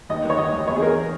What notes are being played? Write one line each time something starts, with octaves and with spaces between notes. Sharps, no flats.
D#2 D#5
D#3
C#5
D#2 D#5
D#2
E2 C#5
G#4
E2 A#4